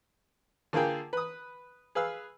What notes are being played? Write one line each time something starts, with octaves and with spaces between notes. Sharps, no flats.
D3 A#3 F4 G#4 G5
B4 D#6
G#4 B4 F5 E6